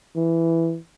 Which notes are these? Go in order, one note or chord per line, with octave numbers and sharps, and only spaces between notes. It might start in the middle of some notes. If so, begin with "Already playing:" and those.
E3